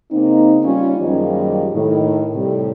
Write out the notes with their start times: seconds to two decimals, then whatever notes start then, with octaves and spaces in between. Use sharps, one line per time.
0.11 C#3 A#3 C4 D#4
0.64 G3 C#4 F4
1.01 F#2 D#3 F3 G3 G#3 A#3
1.73 A2 D#3
2.35 A2 C3 G3